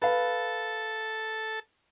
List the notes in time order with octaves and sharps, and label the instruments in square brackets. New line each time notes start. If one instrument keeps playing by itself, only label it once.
[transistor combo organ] A4 [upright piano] B4 F5